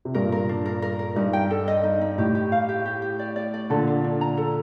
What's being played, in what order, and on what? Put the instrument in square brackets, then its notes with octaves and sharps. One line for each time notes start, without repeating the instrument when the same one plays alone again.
[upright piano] C3
[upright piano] G2 A#2 [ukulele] A#4
[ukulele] A#4
D4
A#4
A#4
A#4
[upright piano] G2 [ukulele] D#4
[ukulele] G5
A4
D#5
D#4
D#4
[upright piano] A2 [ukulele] G4
[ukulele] G4
F5
G4
G4
G4
D5
D5
D5
[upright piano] A#2 D3 [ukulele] A4
[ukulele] D4
D4
A#5
A4